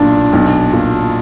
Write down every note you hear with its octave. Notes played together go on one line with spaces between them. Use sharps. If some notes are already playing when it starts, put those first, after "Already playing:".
Already playing: B1 A#2 D4
B1
A#2